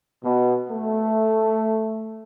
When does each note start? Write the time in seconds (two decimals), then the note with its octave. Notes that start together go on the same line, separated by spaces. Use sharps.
0.24 B2
0.70 A3